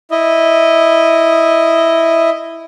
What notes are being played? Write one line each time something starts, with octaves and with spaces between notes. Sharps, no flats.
E4 D#5